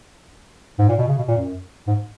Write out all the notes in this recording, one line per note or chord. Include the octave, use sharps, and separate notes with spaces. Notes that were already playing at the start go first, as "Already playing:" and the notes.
G#2
A#2
B2
C#3
B2
A#2
F#2
G#2